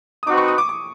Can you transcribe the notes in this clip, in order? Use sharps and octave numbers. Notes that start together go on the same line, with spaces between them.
D#6
C4 D#4 F#4 B4 D6
C#6
D#6
D6
D6